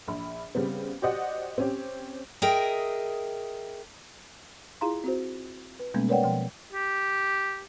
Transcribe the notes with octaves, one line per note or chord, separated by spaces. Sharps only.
A#1 B5
C#3 G3 B3 C4
F#4 G4 C5 D5 D#5 F#5
C4 C#4 G4
G#4 A#4 D#5 E5 G5
E4 F4 G#4 F5 A#5 C6
C4 F#4 C5
B4
B2 G3 G#3 A#3 B3 C#4
A#4 B4 C#5 D5 F#5 G5
B2 F3 G5
G4